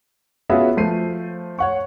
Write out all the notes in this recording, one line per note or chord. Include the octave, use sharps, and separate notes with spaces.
B3 C#4 F4 F#4 G#4 E5
F3 A3 C5 C7 D#7
C#5 F#5 C#6